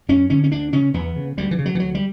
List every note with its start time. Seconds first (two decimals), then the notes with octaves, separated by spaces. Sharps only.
0.09 F#2 C#4
0.30 D3 C#4
0.44 C#4
0.51 D2 D4
0.73 C#3 C#4
0.94 E2 B3
1.16 C#3
1.37 D2 G3
1.51 E3
1.58 C#3
1.65 F#3
1.75 E3
1.80 D2 F#3
1.95 G3